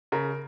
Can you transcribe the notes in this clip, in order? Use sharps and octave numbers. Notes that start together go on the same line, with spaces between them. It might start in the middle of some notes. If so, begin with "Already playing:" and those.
C#3 A#4